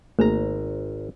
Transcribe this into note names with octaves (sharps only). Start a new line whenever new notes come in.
G#1 A3 A#3 G#4 A#5